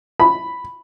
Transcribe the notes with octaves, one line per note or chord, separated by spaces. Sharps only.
B5